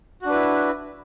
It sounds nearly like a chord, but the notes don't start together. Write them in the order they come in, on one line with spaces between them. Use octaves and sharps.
F#4 D4 B4 E4